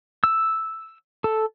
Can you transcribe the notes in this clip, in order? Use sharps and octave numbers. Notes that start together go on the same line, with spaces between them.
E6
A4